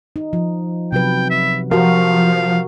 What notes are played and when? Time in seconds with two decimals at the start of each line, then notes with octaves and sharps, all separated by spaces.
0.16 D#4
0.33 F3
0.92 C3 F#3 B4 G5
1.30 E5
1.71 F3 F#4 G4 A#4 F5